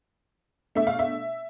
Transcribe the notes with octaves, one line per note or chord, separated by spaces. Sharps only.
B2 A3 D4 E5
F5
E5